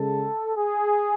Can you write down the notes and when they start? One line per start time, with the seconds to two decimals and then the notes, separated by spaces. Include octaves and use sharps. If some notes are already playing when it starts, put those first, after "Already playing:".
Already playing: C#3 G#3 A4
0.55 G#4